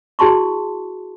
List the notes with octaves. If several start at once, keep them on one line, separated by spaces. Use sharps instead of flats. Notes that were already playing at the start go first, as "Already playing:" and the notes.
E4 F#4 G#4 A5 C6 C#6